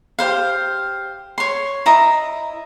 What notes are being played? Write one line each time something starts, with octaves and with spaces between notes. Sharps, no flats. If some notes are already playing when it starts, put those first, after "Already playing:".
G4 C5 F5
C#5 C6
E4 D#5 A#5